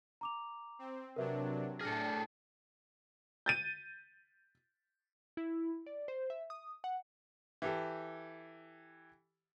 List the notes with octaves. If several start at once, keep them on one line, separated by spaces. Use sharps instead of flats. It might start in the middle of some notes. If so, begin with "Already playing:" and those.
A#5 D6 F7
C4
C3 F#3 D4 A#4 B4 E5
A2 D4 G#4 A4 G5 F6 A#6 C#7
G6 A6 D#7
E4
D5
C5
E5
D#6
F#5
E3 G4 A4